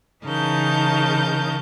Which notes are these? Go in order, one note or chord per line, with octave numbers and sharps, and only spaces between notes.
C#3 E3 D#4 A#4 A5 G6